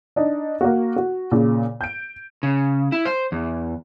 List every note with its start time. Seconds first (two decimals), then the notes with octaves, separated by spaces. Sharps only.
0.16 D4 D#4
0.61 A#3 F#4
0.96 F#4
1.32 A#2 C#3
1.81 G6 D7
2.43 C#3
2.92 E4
3.05 C5
3.32 E2